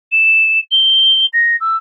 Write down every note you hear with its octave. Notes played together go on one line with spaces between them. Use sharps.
E7
G7
A#6
E6